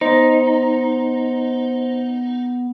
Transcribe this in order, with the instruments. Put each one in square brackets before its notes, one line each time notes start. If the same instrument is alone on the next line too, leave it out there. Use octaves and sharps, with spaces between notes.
[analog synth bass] B3 [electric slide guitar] D#4 [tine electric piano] C5